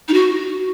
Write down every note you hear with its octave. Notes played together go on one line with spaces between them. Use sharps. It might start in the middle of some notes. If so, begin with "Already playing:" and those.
D#4
F#4